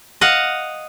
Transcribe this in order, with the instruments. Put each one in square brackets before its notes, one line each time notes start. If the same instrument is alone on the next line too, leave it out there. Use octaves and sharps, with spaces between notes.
[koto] D#5 F5 F#5